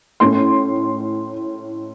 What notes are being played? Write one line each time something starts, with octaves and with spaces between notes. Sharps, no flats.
A2 A3 C#4 C6